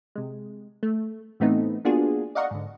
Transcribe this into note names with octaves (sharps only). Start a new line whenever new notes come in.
C3 G#3
A3
A2 E3 A3 B3 C4 D#4
A#3 B3 D4 F4 F#4 G#4
D5 D#5 F5 F#5 A#5 C#6
G#2 D3